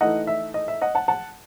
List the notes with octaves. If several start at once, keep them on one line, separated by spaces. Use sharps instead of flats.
E3 A3 D#4 D#5 F#5
E5
D#5
E5
D#5 F#5
F#5 A5
F#5 A5